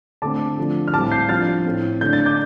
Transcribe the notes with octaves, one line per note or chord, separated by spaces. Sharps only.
D3 A3 C4 A5 D6
D3 F3 A3
F6
A2 G3 C4 A5 D6
G6 C7
F3 D4 F6 A6
A2 A3 C4
D3 A3 D4 G6
A6
D6 G6